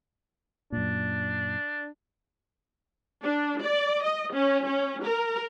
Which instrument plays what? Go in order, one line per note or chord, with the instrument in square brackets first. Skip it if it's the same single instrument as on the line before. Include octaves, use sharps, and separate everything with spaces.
[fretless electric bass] F#2 A#2 [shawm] D4
[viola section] D4
D5
D#5
C#4
C#4
A#4